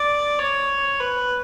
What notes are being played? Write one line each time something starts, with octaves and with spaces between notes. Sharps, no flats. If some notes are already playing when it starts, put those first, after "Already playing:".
Already playing: D5
C#5
B4